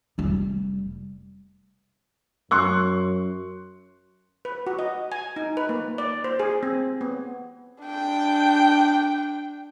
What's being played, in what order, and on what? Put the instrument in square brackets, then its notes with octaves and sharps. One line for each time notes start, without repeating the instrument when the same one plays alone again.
[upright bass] F1 G3
[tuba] F#2 [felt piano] C6 C#6 F#6
[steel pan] B4
F#4
D#5
G#5
D#4
B4
A#3
D5
C5
G#4
C4
B3
[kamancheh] D4 G5